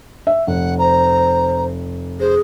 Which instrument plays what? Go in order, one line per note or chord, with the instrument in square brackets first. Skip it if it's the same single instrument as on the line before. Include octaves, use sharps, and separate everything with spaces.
[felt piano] E5
[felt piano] F1 [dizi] F#5
[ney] C5 [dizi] A#5
[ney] G#4 [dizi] C5